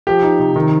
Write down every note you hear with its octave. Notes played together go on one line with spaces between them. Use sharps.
F3 G4
D#4
C3
D#3